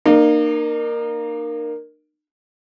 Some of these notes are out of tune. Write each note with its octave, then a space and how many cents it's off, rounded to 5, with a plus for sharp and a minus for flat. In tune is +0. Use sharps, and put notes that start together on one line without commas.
A#3 +5 D#4 -40